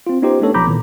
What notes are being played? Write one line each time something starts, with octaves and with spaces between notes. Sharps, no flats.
C4 F4
B3 C#4 D#4 F4 G4 C5
A3 B3 C#4 D4 A4 C#5
B1 F3 A#5 B5 D6 G6
A#2 D#3 E3 B3